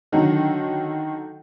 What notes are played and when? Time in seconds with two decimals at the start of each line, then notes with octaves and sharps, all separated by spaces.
0.12 D3 D#3 F#3 D#4 F#4 A4